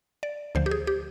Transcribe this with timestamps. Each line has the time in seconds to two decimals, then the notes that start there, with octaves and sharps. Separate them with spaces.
0.23 D5
0.55 D2 D3 F3 C5
0.66 G4
0.71 G#4
0.87 G4